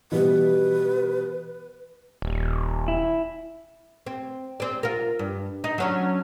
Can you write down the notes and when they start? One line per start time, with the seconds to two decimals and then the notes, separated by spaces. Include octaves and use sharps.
0.12 B2 E3 G3 B3 B4
2.22 D#1
2.88 E4
4.06 C4
4.60 C4 D5
4.83 F4 A#4
5.19 G2
5.64 D#4
5.78 F#3 C#4 D4